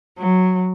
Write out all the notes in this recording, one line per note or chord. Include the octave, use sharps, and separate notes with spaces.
F#3